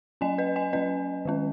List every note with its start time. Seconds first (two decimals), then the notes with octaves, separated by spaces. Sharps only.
0.21 F#3 C#4 D#5 G#5
0.38 B4 D#5
0.56 D#5 G#5
0.73 F#3 C#4 B4 D#5
1.25 D#3 G#3 C#4